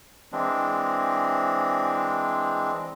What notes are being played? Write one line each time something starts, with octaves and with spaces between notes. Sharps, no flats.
E3 G#3 C4 D4